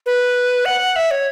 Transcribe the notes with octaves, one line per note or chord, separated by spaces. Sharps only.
B4
F#5
E5
C#5